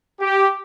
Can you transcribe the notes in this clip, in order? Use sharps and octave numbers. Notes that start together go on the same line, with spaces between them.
G4